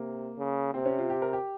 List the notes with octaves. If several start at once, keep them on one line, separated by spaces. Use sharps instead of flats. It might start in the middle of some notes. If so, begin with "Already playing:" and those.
Already playing: C3 A#3
C#3
C3 C4
C#4
F4
G4
A#4
G4